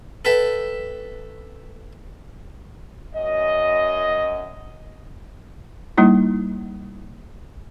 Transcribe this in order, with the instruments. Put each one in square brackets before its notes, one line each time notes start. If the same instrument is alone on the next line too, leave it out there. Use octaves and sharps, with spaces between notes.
[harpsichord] A4 B4 E5 G5 A5
[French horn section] F#2 D#5
[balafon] G3 A#3 D#4 E4